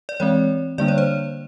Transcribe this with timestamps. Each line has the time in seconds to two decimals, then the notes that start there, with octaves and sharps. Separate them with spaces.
0.09 D5
0.20 E3 G#3 C4 C#5
0.78 D3 G3 A#3 D4 D5
0.88 C#5
0.98 C5